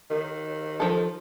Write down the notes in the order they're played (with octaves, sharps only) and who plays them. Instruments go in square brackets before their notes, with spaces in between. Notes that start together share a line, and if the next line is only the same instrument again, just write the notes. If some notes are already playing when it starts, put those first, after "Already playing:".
[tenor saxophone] D#3
[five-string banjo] F3 A4